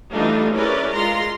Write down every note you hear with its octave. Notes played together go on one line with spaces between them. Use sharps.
E3 G3 A3 D4 D#4 F4
C#4 E4 G#4 A#4 B4 D5
G#3 F4 A#5 C6